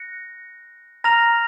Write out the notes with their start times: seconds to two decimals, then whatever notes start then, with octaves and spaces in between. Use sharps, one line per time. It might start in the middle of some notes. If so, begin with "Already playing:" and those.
Already playing: F#6 A#6 C#7
1.04 A#5 F6 A#6 F7